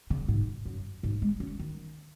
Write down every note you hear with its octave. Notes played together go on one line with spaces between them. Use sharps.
C#3
G#2
F#2
G#2
G#3
C#4
D#3